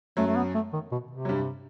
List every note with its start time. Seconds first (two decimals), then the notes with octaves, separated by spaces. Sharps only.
0.17 F#2 F#3 A3
0.27 A3
0.36 B3
0.54 A3
0.73 D#3
0.92 B2
1.11 C3
1.25 F#3
1.29 G2 G3